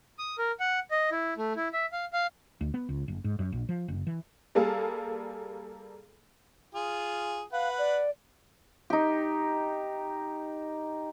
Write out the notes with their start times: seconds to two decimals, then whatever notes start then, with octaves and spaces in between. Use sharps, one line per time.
0.19 D#6
0.38 A#4
0.60 F#5
0.91 D#5
1.12 E4
1.37 A3
1.56 E4
1.73 E5
1.93 F5
2.13 F5
2.61 D2
2.74 B3
2.89 C#2
3.08 F#1
3.24 G#2
3.39 F#2
3.52 A#1
3.69 F3
3.88 F#1
4.07 E3
4.55 G3 A#3 G#4 A4 F5
6.75 F4 G#4
7.52 B4 F5 F#5
7.78 D5
8.90 D#4 G4